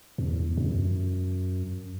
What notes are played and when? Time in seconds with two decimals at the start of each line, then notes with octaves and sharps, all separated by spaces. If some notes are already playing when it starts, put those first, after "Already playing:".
0.18 E2
0.57 F#2